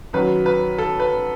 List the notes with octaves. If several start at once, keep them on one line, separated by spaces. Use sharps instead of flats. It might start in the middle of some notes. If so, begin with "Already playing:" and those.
F#2 D#3 F#3 B4
B4
A4
B4